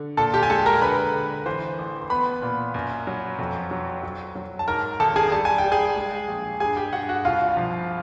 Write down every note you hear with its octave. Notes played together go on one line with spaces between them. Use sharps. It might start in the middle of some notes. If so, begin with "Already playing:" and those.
Already playing: D3
A#2 A4 A5
G4 G5
G#5
G#3 A4 A5
A#4 A#5
D3 B4 B5
D3
E3 C5 C6
A1
C6
B3 B4 B5
A#2
F#2
F#3
F2
F#3
F#3
F#3
A5
G#2 A#4 A#5
G#1 A4 A5
G#4 G#5
G3 A5
G#5
G5
G3
G#4 G#5
G#3
A#1
G2 G#4 G#5
G4 G5
G2 F#4 F#5
F#4 F#5
C2 F4 F5
F3